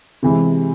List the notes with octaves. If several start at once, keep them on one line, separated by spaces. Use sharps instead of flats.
C3 E3 G#3